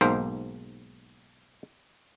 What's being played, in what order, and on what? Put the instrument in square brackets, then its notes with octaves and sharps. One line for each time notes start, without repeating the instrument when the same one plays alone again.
[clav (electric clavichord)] B1 G#2 A#3 C5